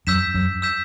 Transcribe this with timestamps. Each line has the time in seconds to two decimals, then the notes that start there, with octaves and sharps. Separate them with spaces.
0.07 F#2 E6 G6 B6 E7
0.34 F#2
0.62 E6 G6 B6 E7